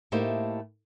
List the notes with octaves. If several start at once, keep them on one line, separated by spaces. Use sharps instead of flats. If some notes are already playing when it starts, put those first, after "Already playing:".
A2 A3 A#3 D#4 G4 C5